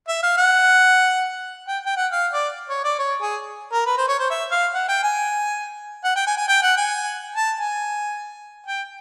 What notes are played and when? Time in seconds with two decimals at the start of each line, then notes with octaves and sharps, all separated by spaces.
0.08 E5
0.23 F5
0.38 F#5
1.68 G5
1.86 G5
1.97 F#5
2.12 F5
2.33 D5
2.69 C#5
2.84 D5
2.99 C#5
3.21 G#4
3.72 A#4
3.86 B4
3.97 C5
4.08 C#5
4.19 C5
4.30 E5
4.51 F5
4.74 F#5
4.88 G5
5.03 G#5
6.04 F#5
6.16 G5
6.27 G#5
6.38 G#5
6.48 G5
6.62 F#5
6.77 G#5
7.36 A5
7.58 G#5
8.66 G5